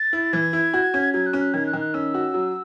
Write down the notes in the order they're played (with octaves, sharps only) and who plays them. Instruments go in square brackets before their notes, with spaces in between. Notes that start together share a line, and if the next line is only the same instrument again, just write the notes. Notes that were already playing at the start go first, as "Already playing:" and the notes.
Already playing: [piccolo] A6
[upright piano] E4
[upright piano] E3 [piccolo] G#6
[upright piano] E4
F#4
C#4
[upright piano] F#3 [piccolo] G#6
[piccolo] F#6
[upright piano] C#4
[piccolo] F#6
[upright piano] D#3 [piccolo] G#6
[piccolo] F#6
[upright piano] D#3
[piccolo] F#6
[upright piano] C#4 [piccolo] E6
[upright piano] F#4
F#3